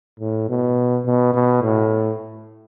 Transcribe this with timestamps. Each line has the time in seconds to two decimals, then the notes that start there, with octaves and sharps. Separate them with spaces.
0.20 A2
0.49 B2
1.05 B2
1.34 B2
1.62 A2